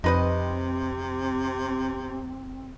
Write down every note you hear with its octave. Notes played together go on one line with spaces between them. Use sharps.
F2 C3 C4 D#4 B4 D#5